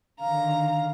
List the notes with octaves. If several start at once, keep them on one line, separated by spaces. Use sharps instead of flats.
D3 D#3 F5 A#5